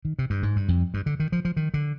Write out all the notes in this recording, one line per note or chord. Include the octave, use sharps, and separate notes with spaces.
D#3
C3
G2
G#2
G2
F2
G2
D3
D#3
F3
F3
D#3
D3